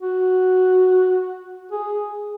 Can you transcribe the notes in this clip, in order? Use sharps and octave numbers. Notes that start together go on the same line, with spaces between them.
F#4
G#4